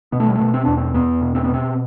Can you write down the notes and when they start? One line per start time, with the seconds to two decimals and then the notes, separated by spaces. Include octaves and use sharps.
0.12 B2 B3
0.20 A3
0.28 G3
0.36 B2 A3
0.54 C4
0.65 E2 D4
0.77 C4
0.94 E2 B3
1.21 B2
1.35 C4
1.44 B3
1.49 B2 C4